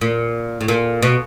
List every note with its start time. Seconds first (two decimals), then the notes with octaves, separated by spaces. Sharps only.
0.01 A#2
0.61 A2
0.68 A#2
1.02 B2